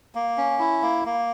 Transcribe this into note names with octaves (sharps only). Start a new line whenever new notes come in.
A#3
C#4
E4
A#3
A#3